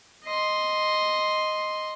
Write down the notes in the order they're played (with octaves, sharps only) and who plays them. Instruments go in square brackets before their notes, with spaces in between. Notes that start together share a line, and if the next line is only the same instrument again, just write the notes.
[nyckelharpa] D#5 C6